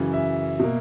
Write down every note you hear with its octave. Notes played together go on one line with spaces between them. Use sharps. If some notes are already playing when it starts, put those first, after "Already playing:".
Already playing: F#2 C#3 E3
E5
B2 A#3